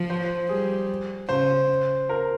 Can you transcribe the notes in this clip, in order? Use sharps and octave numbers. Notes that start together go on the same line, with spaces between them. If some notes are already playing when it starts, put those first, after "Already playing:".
Already playing: F3
C5
G3 G#4
C#3 C5
A#4